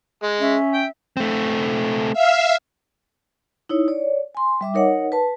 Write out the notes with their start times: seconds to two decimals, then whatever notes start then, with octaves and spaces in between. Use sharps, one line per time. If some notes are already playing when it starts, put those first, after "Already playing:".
0.23 G#3
0.41 C#4 E5
0.74 G5
1.17 A3 C4
2.12 E5 F5
3.69 D#4 E4 C#5
3.88 C#5 D5
4.35 G#5 C6
4.61 G3 E5 D6
4.74 D#4 A#4 C#5 D#5 F#5
5.12 B4 A5